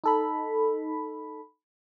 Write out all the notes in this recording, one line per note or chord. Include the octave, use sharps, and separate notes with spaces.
D#4 A4 B5